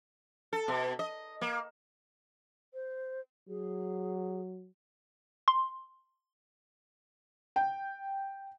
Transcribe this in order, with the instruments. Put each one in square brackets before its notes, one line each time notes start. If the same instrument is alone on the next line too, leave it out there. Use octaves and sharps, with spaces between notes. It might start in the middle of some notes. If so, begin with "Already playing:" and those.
[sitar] A4
B2
D#5
A#3
[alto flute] C5
[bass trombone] F#3 [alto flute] G#4
[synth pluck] C6
[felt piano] G5